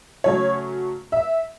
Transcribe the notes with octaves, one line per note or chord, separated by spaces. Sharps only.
C#3 F#3 A3 C#4 C#5
E5